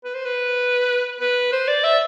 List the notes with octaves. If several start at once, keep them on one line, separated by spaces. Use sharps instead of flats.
B4
C5
B4
B4
C5
D5
E5